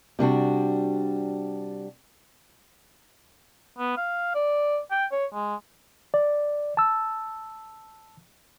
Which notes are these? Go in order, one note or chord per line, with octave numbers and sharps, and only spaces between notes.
C3 G3 D4 F#4
B3
F5
D5
G5
C#5
G#3
D5
A5 E6